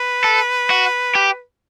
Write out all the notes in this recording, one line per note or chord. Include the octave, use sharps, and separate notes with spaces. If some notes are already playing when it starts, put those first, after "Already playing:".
Already playing: B4
A4
F#4
G4